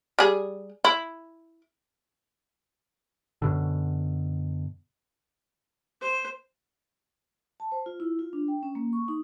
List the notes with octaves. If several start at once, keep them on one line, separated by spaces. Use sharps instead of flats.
G3 G#4
E4
F#2 B2 D3
C5
A5
C5
F4
E4
F4
D4
G5
C#4
A#3
C#6
D#4